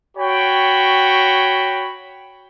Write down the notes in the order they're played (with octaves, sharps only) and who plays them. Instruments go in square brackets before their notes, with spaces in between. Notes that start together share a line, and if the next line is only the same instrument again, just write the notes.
[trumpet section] F#4 C#5 G5 B5